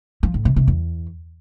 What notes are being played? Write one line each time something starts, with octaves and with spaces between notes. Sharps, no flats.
F3
A2
C3
C3
E2